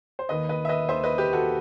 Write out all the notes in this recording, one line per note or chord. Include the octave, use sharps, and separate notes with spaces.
C5
D#2 D#3 B4 D#5
B4 D#5
E5
B4 D#5
D#2 D#3 C5 E5
B4 D#5
G4 B4
F#4 A4